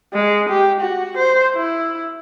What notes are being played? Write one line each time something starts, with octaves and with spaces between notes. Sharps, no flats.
G#3
G4
F#4
C5
E4